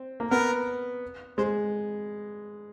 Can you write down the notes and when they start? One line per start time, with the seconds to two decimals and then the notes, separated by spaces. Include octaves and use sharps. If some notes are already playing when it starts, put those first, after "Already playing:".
Already playing: C4
0.20 A#3
0.31 B3 A#4
1.38 G#3 C5